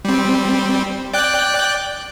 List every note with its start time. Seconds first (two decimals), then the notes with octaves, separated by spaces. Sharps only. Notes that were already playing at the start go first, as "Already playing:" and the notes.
0.05 G3 C4
1.14 D5 G5 F#6